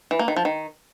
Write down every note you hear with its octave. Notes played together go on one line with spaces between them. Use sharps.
E3
A#3
D#3
F3
D#3